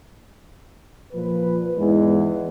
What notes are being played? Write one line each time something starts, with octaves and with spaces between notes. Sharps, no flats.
A#2 F3 B4
E2 G#2 E3 G#3